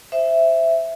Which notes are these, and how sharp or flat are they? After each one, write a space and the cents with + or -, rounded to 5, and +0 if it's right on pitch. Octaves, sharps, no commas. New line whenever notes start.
C5 +0 E5 +0